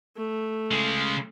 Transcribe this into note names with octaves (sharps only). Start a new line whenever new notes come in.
A3
C#3 G#3